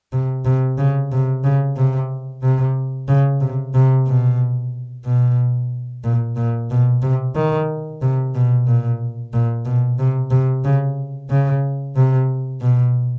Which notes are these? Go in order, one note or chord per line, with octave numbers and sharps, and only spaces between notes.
C3
C3
C#3
C3
C#3
C3
C3
C#3
C3
C3
B2
B2
A#2
A#2
B2
C3
D#3
C3
B2
A#2
A#2
B2
C3
C3
C#3
C#3
C3
B2